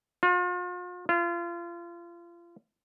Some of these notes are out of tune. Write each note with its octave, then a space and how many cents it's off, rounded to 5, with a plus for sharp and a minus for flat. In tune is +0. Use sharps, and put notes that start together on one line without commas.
F4 +40
F4 -30